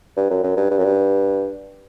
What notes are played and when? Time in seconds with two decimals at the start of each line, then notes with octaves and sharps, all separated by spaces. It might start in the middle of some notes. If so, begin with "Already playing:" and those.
0.17 G2
0.30 F#2
0.43 F#2
0.57 G2
0.71 G2
0.78 F#2
0.85 G2